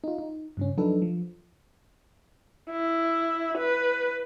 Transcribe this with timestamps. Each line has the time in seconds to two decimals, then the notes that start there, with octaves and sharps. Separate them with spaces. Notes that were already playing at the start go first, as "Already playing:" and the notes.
0.04 D#4 F4
0.18 D#4
0.57 G2 C#3 C#4
0.77 F3 F#3 D4 D#4 A4 B4
1.02 F3
2.70 E4
3.58 B4